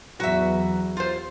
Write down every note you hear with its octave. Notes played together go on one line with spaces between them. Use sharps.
E2 F#3 F#4 E5 A#5
F4 G4 C5